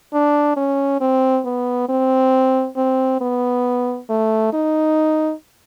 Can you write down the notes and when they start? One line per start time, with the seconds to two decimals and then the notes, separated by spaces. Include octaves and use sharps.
0.13 D4
0.57 C#4
1.01 C4
1.46 B3
1.89 C4
2.77 C4
3.21 B3
4.10 A3
4.53 D#4